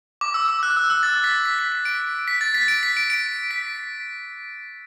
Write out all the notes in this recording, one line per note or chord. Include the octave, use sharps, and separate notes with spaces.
D6
E6
E6
F#6
E6
E6
A6
B6
B6
B6
B6
D7
B6
A6
B6
D7
B6
D7
D7
B6